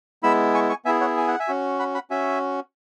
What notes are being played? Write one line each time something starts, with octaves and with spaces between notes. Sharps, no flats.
G#3 B3 E4 B5 E6
G#5 C#6
G#5 C#6
B3 E4 G#4 E5 G#5
C#5 F#5
G#5
F#5
E5 G#5
C#4 F#4
F#5 B5
F#5 B5
C#4 F#4 E5 G#5